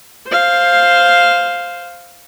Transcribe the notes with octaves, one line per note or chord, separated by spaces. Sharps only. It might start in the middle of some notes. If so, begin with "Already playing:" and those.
C5 F5